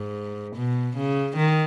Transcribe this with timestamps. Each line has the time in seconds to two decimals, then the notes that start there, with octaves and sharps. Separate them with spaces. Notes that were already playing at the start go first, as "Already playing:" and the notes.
Already playing: G#2
0.56 B2
0.97 C#3
1.36 D#3